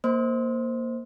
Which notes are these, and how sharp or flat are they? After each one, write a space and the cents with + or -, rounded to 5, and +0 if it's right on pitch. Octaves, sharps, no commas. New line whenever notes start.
A#3 +0 C5 +0